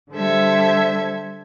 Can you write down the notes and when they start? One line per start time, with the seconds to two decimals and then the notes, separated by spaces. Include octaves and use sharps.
0.12 D3 G3 A4 C5 E5 G#6